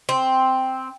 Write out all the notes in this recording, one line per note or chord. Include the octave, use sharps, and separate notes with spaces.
C4